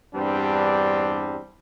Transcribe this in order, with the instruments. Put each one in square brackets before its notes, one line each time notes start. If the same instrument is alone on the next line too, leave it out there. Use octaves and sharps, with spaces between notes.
[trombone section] E2 G2 G3 C4 D4